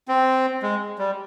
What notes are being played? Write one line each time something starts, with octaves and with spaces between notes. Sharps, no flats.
C4
G#3
G3